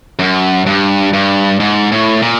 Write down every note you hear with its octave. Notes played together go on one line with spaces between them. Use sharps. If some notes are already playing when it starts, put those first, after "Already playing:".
F#2
G2
G2
G#2
A2
A#2